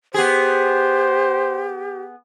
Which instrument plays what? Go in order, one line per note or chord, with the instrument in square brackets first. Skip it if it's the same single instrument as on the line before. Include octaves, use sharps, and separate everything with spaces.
[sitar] B3 G#4 [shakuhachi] G4 [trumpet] C5